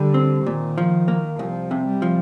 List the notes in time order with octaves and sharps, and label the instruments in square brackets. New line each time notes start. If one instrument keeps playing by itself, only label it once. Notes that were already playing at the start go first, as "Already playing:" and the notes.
Already playing: [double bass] D3 [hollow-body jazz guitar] G3
[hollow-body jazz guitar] C4
[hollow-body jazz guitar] A#2 [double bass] D#3
[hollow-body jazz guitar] F3
A#3
[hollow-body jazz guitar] C2 [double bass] F3
[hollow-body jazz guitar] C3
[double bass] G3
[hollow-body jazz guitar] F3